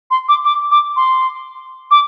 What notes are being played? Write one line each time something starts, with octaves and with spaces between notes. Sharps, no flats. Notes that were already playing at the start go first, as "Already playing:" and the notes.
C6
D6
D6
D6
C6
D6